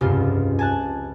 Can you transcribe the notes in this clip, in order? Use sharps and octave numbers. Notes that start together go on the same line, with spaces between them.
F1 C#2 G2 F4
G#5 A5 F#6